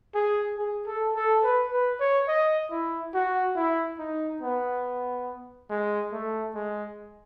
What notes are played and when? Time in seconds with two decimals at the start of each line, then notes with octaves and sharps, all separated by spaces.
0.15 G#4
0.58 G#4
0.87 A4
1.15 A4
1.44 B4
1.71 B4
2.00 C#5
2.28 D#5
2.71 E4
3.14 F#4
3.56 E4
3.99 D#4
4.42 B3
5.70 G#3
6.12 A3
6.55 G#3